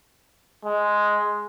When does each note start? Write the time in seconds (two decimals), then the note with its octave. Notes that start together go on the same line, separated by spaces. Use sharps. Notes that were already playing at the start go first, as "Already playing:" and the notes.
0.65 G#3